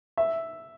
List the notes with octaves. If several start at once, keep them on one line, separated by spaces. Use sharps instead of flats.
E5